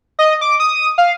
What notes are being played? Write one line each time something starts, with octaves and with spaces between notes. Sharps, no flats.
D#5
D6
D#6
F5